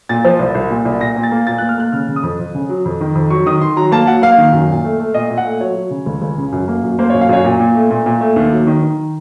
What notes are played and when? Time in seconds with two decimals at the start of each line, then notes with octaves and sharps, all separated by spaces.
0.09 A#2 A6
0.25 F3
0.39 C2
0.55 C2
0.70 A#2
0.85 C2
1.01 A#2 A#6
1.16 A#2
1.23 A6
1.32 A#3
1.47 A#2 A6
1.58 A#3 F#6
1.69 F6
1.78 A#3 F#6
1.93 C#3 F6
2.08 C#3
2.16 D#6
2.23 F2
2.39 F2
2.55 C#3
2.69 F#3
2.85 F2
3.01 D#3
3.15 F2
3.30 F#3 C#6
3.46 D#3 D#6
3.61 D#3 C6
3.77 F#3 A#5
3.92 A#3 A5
4.07 F#3 F#5
4.22 A#3 F5
4.38 D#3
4.53 F#2
4.69 A#2
4.84 A3
5.00 A3
5.14 A#2 D#5
5.30 A#2
5.38 F#5
5.45 A3
5.61 F#3 C#5
5.75 F#3
5.91 C#3
6.06 C#2
6.22 C#2
6.38 C#3
6.52 F#2
6.68 A#3
6.83 F#2
6.99 A#3 C5
7.10 F#2 C#5
7.21 F5
7.29 F#2 C#5
7.44 A#2
7.60 A#2
7.75 A3
7.90 A#2
8.06 A#2
8.21 A3
8.36 D#2
8.52 F#3
8.67 D#3
8.83 D#3